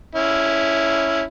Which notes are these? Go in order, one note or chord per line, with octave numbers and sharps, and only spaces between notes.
C#4 E4